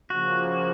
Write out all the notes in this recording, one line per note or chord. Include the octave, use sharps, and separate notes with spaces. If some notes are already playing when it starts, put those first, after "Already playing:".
C#3 F3 A#3 F#4